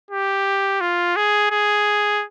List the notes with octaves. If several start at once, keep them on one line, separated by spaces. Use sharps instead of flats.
G4
F4
G#4
G#4